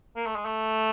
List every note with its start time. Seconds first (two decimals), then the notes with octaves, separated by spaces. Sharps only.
0.16 A#3
0.26 A3
0.36 G#3
0.46 A3